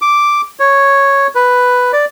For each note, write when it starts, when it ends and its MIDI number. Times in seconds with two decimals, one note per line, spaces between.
0.02 0.42 86
0.60 1.27 73
1.35 1.92 71
1.93 2.05 74